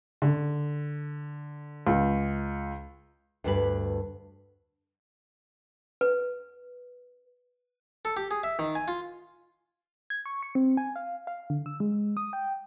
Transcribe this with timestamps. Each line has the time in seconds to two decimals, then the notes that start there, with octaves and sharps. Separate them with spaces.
0.22 D3
1.87 C#2
3.44 D2 G2 B4
6.01 B4
8.05 A4
8.17 G4
8.31 G#4
8.44 E5
8.59 D#3
8.75 G#5
8.88 F4
10.10 G#6
10.26 C#6
10.43 C#7
10.55 C4
10.77 G#5
10.96 F5
11.27 F5
11.50 D3
11.66 E6
11.80 G#3
12.17 D#6
12.33 G5